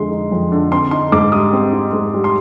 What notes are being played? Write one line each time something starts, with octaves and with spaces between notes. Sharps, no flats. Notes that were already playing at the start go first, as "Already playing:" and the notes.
Already playing: F2 D3 G#3 C6
D#4
F2
D3
C4 C6
D#4 C6
G#2 D6
G3 D#6
C4
D#4
G#2
G3
C6